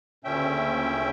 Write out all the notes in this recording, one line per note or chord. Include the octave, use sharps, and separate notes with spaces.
D2 A#2 C#3 C#4 E5 G5